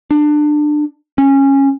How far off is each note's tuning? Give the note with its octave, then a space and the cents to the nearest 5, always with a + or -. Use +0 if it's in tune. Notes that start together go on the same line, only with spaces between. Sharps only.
D4 +25
C#4 -15